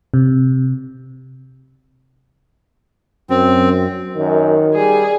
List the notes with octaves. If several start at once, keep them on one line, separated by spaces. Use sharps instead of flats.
C3
F#2 C4
F#2 D#3
G3 G#4